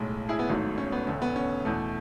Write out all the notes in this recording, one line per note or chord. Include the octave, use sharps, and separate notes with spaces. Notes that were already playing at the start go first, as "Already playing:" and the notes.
Already playing: B1 A2 G#3
E4 G#4
B3
G#1 G#2 F#3 A3
C#4
B3
E1 D2 D3 A3 C#4
B3
C#4
E2 B2 A3